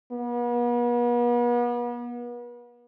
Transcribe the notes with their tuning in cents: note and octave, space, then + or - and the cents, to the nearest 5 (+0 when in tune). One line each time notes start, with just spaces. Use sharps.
B3 -40